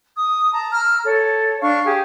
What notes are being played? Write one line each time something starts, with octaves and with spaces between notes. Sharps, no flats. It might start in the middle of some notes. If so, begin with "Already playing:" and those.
D#6
A5 A#5
A#5 E6 F6
A4 C#5
D4 F5 C#6
G4 G#4